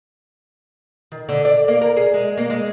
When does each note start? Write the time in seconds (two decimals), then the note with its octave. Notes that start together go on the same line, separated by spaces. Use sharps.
1.12 D#3
1.29 D3
1.45 D5
1.68 A#3
1.82 A#4
1.97 G#4
2.14 G#3
2.37 A#3
2.50 G#3